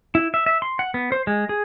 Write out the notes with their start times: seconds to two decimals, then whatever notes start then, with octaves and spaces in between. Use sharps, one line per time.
0.15 E4
0.34 E5
0.46 E5
0.62 C6
0.79 F#5
0.94 B3
1.12 C5
1.27 G#3
1.49 G#4